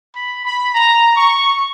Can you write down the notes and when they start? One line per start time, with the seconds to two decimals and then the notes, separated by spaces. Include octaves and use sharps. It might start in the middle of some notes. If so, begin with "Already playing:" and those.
0.15 B5
0.44 B5
0.73 A#5
1.16 C#6